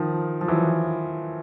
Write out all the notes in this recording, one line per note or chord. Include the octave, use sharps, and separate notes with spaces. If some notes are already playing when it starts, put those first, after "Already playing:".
Already playing: D#3 F3
F3
E3 F#3